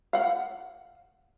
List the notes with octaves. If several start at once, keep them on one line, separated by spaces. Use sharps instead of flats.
F5 F#5